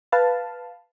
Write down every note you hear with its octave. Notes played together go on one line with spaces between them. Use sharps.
B4 F5 A5